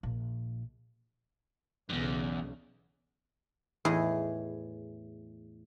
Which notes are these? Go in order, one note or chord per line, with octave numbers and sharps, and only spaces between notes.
A#1
B1 E2 G2 C#3
E2 A2 G#4 D#5